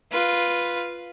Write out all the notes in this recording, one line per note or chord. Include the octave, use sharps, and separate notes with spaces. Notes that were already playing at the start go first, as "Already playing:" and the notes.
F4 B4